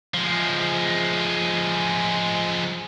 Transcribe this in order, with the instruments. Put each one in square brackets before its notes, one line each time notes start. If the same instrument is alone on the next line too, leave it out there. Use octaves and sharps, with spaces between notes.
[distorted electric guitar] F3 G#3